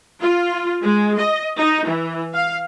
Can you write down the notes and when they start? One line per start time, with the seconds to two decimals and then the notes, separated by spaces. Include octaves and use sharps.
0.21 F4
0.83 G#3
1.19 D#5
1.58 D#4
1.88 E3
2.34 F5